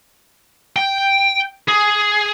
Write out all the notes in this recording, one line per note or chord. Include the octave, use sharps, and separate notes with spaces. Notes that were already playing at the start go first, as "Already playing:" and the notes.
G5
G#4